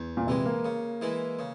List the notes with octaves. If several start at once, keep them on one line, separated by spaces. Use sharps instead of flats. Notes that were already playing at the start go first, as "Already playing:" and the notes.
Already playing: E2
A#2
C3 E3 G#3
A#3
C#3
E3 G#3 E4
C#3